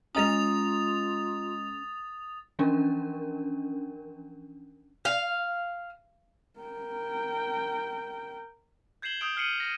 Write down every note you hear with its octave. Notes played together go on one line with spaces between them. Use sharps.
G#3 C#4 F4 D#5 A#5 D#6 A6 F7
E3 F3 C#4 D4 A#4
F5
A#4 G5
G6 G#6 C7 E7 F#7 G7
D#6 E6 G6 D7
F6 G6 C7 C#7 D#7 F#7
A#6 D#7